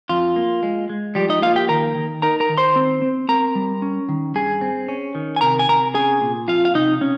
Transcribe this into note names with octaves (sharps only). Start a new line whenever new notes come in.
F2 F4
A#3
G#3
G#3
F3 G3 G4
D#4 D#5
A#3 F4 F5
G4 G5
D#3 A#4 A#5
D#3
D#4 A#4 A#5
A#4 A#5
D#3
C5 C6
C4
C4
C4 A#4 A#5
G3
C#4
D#3
G2 G#4 G#5
C4
C#4
D#3
G#5
C3 A#4 A#5
G#5
C3 A#4 A#5
C#4 G#4 G#5
A#2
F2 F4 F5
F5
C3 D#4 D#5
C3 C#4